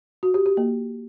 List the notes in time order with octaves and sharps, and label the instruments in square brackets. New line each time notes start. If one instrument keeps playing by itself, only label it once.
[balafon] F#4
G4
G4
A#3